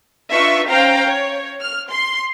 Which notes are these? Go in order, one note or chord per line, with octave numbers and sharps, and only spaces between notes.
D4 D#4 F4 B4 E5 C#6
C#4 C5 F5 G5 A#5
C#5
F6
C6